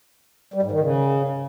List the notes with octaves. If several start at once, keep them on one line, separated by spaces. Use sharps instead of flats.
G3
G#2
D#3
C#3